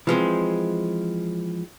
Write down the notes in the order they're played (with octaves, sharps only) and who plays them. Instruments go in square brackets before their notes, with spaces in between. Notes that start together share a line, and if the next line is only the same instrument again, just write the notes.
[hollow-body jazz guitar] E3 F3 G#3 C4